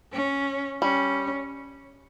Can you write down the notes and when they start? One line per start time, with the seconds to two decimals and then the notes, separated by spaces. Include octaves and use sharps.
0.13 C#4
0.82 G3 C#4